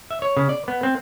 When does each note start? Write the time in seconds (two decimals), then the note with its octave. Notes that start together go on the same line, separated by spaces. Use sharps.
0.11 E5
0.22 C#5
0.37 C#3
0.49 D5
0.68 B3
0.83 C4